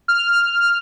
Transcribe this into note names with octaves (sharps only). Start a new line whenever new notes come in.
F6